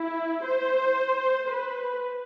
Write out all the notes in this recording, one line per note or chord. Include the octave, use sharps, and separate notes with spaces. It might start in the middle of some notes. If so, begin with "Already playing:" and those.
Already playing: E4
C5
B4